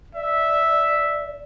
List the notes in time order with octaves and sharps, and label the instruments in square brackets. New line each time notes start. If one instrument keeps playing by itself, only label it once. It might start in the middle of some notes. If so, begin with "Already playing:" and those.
[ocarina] D5 [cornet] E5